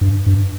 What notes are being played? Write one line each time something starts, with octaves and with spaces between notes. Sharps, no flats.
G2
G2